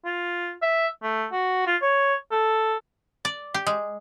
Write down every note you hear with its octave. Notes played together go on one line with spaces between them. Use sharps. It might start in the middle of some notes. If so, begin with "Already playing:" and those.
F4
E5
A3
F#4
F4
C#5
A4
D5
G4
G#3